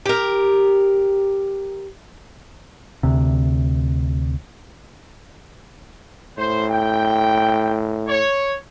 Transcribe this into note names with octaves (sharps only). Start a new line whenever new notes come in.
G4 A#4
D2 C3
A2 C5
G5
C#5